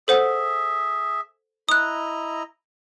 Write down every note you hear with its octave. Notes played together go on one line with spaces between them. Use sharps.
G#4 A4 C5 E5 F#5
E4 D#5 A#5 D#6 F#6